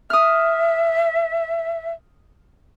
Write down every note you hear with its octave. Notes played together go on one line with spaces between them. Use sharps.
E5 D#6 F6